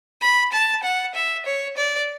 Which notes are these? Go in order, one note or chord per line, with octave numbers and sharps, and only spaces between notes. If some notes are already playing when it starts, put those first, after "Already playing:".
B5
A5
F#5
E5
C#5
D5